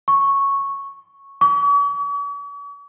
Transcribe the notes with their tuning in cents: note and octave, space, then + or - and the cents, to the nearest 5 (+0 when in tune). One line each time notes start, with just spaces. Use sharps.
C#6 -5
C#6 +45